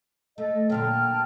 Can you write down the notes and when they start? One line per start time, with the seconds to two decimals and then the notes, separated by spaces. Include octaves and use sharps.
0.38 A3 A4 D#5
0.70 A#2 D3 F#3 G5 A5 F6